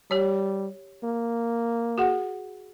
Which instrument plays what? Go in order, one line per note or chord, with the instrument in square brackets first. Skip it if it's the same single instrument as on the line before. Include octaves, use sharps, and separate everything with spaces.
[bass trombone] G3 [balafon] G4 C#5
[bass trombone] A#3
[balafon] F#4 G#4 F#5